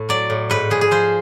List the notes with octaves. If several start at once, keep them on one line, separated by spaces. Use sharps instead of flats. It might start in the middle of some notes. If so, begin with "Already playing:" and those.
Already playing: A2
F#3 D5
A2
G#2 B4
F3 G#4
G#4
F3 C5